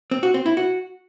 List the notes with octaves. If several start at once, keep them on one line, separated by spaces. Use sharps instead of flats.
C4
F#4
C4
E4
F#4